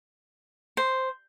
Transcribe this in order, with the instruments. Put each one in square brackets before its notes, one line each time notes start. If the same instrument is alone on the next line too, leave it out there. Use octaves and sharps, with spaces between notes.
[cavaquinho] C5